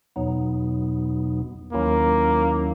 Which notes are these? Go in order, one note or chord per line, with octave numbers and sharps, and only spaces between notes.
E2 B2 F#3 B3 D#4
D#2 D#3 F#3 A#3 C#4 E4